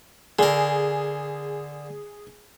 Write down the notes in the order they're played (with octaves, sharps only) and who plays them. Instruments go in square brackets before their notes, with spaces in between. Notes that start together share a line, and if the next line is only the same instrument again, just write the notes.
[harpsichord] D3 A#4 [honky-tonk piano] G#4